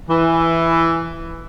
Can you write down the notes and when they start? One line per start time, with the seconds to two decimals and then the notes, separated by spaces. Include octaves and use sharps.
0.09 E3